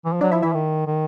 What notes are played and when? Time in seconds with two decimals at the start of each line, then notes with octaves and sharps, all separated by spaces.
0.05 E3
0.13 F3
0.21 F#3 D4 D5
0.32 F3 E4 E5
0.42 E3 E4 E5
0.54 D#3
0.87 D#3